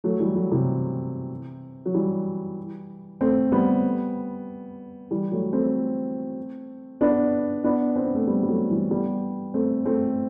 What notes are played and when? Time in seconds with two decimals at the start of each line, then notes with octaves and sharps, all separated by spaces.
0.04 F#3 A3
0.20 E3 G3
0.35 F#3 A3
0.52 C3 E3
1.86 F#3
1.94 E3 G3
3.21 A3 C4
3.52 G3 B3
5.11 E3 G3
5.32 F#3 A3
5.53 A3 C4
7.01 B3 D4
7.64 B3 D4
7.96 C4
8.05 B3
8.15 A3 C4
8.27 G3 B3
8.43 G3
8.48 F#3 A3
8.70 E3 G3
8.91 G3 B3
9.54 A3 C4
9.85 A3 C4